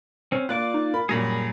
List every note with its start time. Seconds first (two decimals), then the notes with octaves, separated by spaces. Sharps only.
0.32 C4 C#4
0.49 A#3 F4 D5 D6 F#6
0.74 D#4
0.94 A#4 B5
1.09 F#2 A#2 G3 G#4 A#5 B5